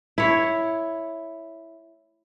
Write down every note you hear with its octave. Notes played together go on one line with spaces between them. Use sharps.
E4 C#5